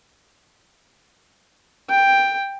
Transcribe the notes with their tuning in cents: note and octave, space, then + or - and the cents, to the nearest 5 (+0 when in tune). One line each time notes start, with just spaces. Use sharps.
G5 +10